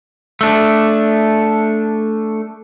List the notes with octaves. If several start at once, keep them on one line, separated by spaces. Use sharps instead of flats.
A3 D4